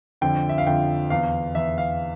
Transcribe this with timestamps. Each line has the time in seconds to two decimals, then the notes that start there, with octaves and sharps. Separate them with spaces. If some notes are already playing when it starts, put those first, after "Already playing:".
0.21 F2 D3 F3 G5
0.49 E5
0.58 F5
0.66 F2 D3 F3 G5
1.10 E2 E3 F5
1.55 E2 E3 E5
1.78 F5